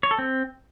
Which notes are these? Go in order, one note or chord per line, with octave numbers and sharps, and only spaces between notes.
C#5
A4
C4